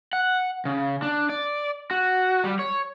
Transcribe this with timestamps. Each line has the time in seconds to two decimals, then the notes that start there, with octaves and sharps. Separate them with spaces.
0.13 F#5
0.65 C#3
1.02 D4
1.29 D5
1.91 F#4
2.44 G3
2.59 C#5